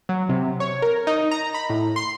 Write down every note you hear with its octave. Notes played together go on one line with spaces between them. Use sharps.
F#3
C3
C#5
A#4
D#4
A#5
B5
A2
C6